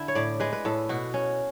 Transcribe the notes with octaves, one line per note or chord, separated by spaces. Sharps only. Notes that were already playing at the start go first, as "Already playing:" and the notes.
Already playing: D3 E4
C#5
A2 D5
G#3 B4
B4
A2 A4
B2 F#4
C#4